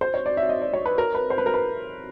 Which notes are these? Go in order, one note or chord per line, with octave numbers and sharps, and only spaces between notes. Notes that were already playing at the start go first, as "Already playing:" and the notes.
C5
C#5
D5
E5
D#5
D5
C#5
B4
A#4
B4
C5
B4
A#4
B4